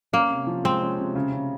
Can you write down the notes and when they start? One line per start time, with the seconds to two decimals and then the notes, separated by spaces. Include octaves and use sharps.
0.13 A#3 C#4
0.30 C3
0.47 F3
0.64 G#3 C4
0.82 C#4
0.98 C3
1.15 C#3
1.32 C#3